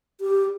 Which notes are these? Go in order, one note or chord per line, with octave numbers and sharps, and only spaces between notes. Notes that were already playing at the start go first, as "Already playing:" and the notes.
G4